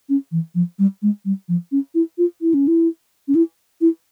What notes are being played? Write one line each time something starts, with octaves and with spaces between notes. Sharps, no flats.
C#4
E3
F3
G3
G#3
G3
F3
C#4
E4
F4
E4
C#4
E4
C#4
E4
E4